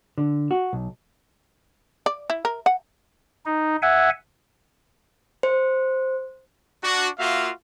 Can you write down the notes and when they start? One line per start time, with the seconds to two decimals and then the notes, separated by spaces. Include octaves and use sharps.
0.18 D3
0.51 F#4
0.73 B1
2.06 D5
2.30 E4
2.45 A#4
2.66 F#5
3.46 D#4
3.82 E5 F#5 G#5
5.43 C5
6.84 D4 F#4
7.19 A#3 F4 F#4 E5 F5